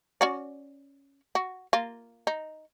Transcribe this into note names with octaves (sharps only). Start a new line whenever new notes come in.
C#4 F#4 D5
F#4
A#3 F4
D#4